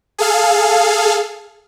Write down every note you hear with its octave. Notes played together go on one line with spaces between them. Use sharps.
G#4 A4 F5